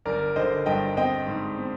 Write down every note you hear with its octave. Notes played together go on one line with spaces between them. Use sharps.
G1 A#4 D5
D3 C5 D#5
G2 D#5 G5
C4 D#5 G5
G#2
C4